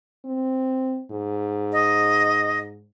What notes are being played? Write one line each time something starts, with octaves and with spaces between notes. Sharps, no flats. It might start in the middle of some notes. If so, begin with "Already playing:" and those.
C4
G#2
D#5